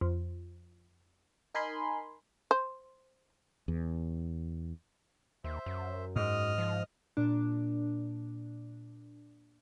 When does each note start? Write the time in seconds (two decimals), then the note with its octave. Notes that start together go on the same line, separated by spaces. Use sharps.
0.01 F2
1.55 D#4 A#4 G#5 B5 C6
2.51 C5
3.68 E2
5.44 D#2 C5 E5
5.66 F#2
6.16 G#2 D#5 D#6 F6
6.58 F3
7.17 A#2 D4